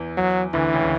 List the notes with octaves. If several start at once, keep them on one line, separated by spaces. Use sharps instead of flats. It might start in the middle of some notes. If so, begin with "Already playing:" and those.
Already playing: E2 E3
F#3
D2 D3 E3
C#2 C#3
C#3